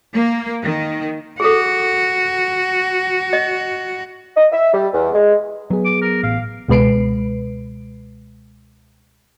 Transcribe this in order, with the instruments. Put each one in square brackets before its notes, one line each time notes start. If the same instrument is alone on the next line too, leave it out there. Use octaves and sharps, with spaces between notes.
[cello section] A#3
D#3
[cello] F#4 [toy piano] G#4 A4
[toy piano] D#5
[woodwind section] D#5
E5
G3
E2
G#3
[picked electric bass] F#3 [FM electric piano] B3 G#4
[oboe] D6
A#4
[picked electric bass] A1 [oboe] F5
[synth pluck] C#2 B2 G#3 B4 C7 D7